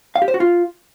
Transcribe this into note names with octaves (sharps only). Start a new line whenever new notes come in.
F5
G4
C5
F#4
F4